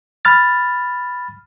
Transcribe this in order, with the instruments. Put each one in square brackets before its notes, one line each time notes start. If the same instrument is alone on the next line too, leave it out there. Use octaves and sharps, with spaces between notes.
[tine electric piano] B5 F6 A6